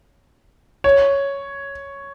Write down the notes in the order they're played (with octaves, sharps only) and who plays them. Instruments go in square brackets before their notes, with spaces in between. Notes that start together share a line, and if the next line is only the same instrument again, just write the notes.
[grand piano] C#5